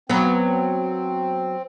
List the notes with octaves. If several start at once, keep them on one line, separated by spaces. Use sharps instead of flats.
F#3 B3 C4